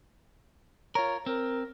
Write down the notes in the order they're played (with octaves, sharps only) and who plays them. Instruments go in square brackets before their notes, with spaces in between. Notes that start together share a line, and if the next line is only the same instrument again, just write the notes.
[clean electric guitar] F4 A#4 [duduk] C#5
[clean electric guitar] C4 [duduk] A#4